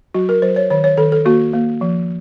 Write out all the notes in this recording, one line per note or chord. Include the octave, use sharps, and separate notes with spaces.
F#3 F#4
A#4
F#3 C5
C#5
D#3 C#5
C#5
D#3 A4
A4
A#3 F#4
A#3
F3